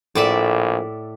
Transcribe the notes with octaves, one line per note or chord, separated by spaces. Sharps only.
A#1 A2 D5 E5